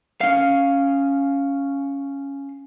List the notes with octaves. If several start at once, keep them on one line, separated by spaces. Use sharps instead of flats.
C#4 F5